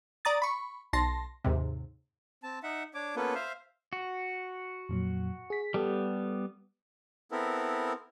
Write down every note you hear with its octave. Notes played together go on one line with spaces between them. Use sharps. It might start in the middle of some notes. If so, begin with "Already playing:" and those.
D5 A#5 D#6 A6
B5 C#6
B1 A5 C6 A#6
D#2 G#2 C3
C4 A5
D#4 E5 F#5
D4 C#5 D6
A#3 B3 C#4 F4 A4 B4
C5 E5 F5
F#4
F2 A#2 F#3
G#4 B6
G3 B3 G4 A4
B3 C4 E4 A4 A#4